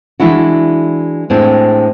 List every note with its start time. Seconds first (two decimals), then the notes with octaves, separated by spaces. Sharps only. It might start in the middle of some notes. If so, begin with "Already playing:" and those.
0.20 E3 G#3 D4 E4 F#4
1.30 A2 G#3 C4 D4